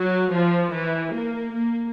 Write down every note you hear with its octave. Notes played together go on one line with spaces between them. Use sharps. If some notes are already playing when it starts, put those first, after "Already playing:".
Already playing: F#3
F3
E3
A#3
A#3